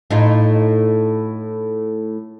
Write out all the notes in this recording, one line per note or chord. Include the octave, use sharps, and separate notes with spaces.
A2 D#4 F4